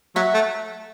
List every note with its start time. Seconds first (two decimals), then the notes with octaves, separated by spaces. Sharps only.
0.15 F#3 E5 F#5
0.34 A3